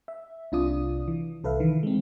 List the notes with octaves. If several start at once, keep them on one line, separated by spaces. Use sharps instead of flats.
E5
C2 C3 D4 F4 D5 D#6
E3
C2 A4 B4 E5 F5
D#3 E3
G#3 C4